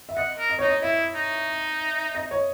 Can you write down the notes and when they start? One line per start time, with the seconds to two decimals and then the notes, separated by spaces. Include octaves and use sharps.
0.09 E5
0.17 D#5 F#5
0.38 A#4
0.50 D#5
0.59 D#4 C#5
0.68 D#5
0.82 E4 E5
1.15 D#4
2.15 D#5
2.31 C#5